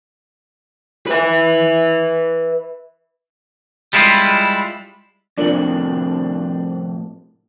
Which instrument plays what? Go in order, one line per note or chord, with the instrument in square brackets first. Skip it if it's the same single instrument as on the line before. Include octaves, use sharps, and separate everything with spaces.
[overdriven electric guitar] B4 E5
[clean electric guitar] G3 G#3 E4 F4
[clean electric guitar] F2 A2 C3 [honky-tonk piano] D4 [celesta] F4 A#4 F#7